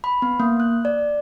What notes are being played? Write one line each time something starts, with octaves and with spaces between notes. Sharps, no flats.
B5
B3
A#3
F#6
D5